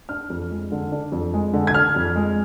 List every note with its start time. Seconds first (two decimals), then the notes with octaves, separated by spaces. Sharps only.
0.09 D4 F6
0.30 F2
0.51 G#3
0.72 D3
0.92 D4
1.12 F2
1.34 G#3
1.53 D3
1.67 G#6
1.74 D4 F6
1.96 F2
2.16 G#3